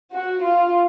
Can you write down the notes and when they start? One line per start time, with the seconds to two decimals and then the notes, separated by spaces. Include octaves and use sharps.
0.12 F#4
0.43 F4